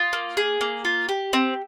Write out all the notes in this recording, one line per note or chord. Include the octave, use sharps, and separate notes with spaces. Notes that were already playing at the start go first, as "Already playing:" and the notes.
Already playing: F4 D#6
A#3
G#4
A#3
F4
G4
C4